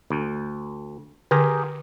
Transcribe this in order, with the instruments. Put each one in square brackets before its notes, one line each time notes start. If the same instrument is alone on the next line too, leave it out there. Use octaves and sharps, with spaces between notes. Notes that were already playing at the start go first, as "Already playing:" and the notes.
[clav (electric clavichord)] D2
[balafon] D3 [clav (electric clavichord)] G4 G#4 A#4